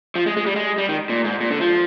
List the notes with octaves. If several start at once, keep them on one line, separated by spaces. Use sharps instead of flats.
F3
G#3
G#3
G3
G#3
G3
D#3
A#2
G#2
A#2
D3
F3